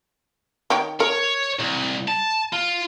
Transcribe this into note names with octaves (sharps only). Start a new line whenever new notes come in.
D#3 C#5 G5
A#4 C#5
C2
A5
F4